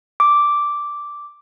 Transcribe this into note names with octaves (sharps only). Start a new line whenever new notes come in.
D6